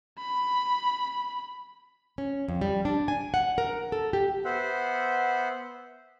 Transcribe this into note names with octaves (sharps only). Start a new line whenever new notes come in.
B5
C#4
F2
G3
D4
G#5
F#5
A#4
A4
G4
B3 C5 E5 F#5